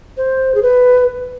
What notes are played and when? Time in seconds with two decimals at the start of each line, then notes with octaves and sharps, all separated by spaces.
0.17 C5
0.55 G#4
0.63 B4